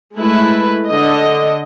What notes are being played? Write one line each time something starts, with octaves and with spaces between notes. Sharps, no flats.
G#3 A3 E4 B4
D3 D#5